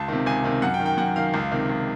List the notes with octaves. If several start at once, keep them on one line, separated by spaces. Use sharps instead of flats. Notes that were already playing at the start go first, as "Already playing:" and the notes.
Already playing: C#2 A5
C3 D#3
C#2 G#5
C3 D#3
F#2 F#5
G5
D#3
G5
F#2 F#5
D#3 F5
C#2
C3 D#3
C#2